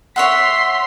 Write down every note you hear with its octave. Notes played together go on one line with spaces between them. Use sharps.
C#5 E5 F#5 C6 B6